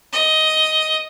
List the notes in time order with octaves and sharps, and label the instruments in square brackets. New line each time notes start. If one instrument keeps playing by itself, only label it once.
[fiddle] D#5